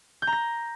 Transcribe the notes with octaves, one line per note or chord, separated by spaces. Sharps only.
G6
A#5
A#6